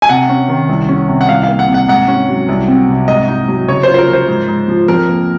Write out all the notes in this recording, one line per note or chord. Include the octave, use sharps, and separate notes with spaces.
G#5
C3 F#5
C#4
D#3
C2
C#4
C3
F#5
C2 F5
F5
A#3
F#5
C3
F#5
G#2 F#5
C#4
F#3
C2
C4
C3
G#2 D#5
D#4
F#3
C#3 C#5
C5
F4
C5
A#4
F3
C5
G#2
G#2
F3
F2 A#4
A#3